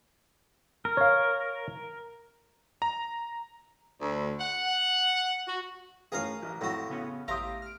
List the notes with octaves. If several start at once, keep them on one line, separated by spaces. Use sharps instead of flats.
A#4
C#5 F5
A#5
D2
F#5
F#4
A2 C#4 F4 G#4 A#4 F5
A1 D#5 A#5
F2 A2 F#4
C#3 B3 C#4
A1 G4 E5 F5 A#5 C6 D#6
F6 D7